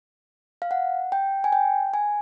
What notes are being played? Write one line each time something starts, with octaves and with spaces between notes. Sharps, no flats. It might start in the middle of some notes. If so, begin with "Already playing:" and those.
F5
F#5
G5
G#5
G5
G#5